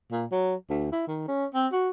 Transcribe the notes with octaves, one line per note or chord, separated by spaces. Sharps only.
A#2
F#3
D2
E4
D#3
C#4
C4
F#4